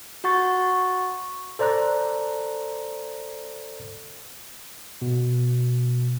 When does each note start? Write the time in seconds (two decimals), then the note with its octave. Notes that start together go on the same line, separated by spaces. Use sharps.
0.24 F#4 F#5 C#6 A6
1.59 A4 C5 D5 A#5 F#6
5.02 B2